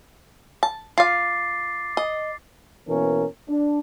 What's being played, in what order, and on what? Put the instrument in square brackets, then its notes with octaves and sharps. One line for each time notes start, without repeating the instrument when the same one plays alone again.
[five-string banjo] A5
[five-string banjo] F4 F5 [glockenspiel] D6 A6 C7
[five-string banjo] D#5
[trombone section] B2 E3 A#3 C#4 A#4
D4